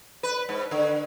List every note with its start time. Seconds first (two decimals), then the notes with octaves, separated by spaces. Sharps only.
0.23 B4
0.49 G#2
0.71 D3